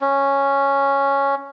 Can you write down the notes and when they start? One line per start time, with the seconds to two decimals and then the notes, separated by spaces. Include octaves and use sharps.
0.01 C#4